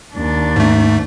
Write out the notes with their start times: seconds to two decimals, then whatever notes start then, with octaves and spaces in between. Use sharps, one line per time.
0.14 D#2 D4
0.56 G#2 A3